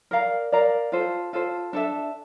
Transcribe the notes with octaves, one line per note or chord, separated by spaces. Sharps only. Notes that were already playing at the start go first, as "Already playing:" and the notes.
A#4 D5 F5 A#5
A#4 D5 F5 A#5
F4 A4 C5
F4 A4 C5
D4 A4 E5